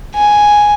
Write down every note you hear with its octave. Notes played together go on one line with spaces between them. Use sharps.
G#5